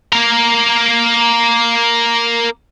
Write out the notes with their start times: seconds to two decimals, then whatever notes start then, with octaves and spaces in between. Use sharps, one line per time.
0.13 A#3 A#4